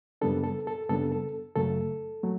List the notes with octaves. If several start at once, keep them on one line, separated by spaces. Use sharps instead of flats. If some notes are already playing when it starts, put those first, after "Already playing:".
F#2 C#3 G3 B3 D4 A4
A4
A4
F#2 C#3 G3 B3 D4 A4
A4
F#2 C#3 F#3 A3 A4
F#3 A3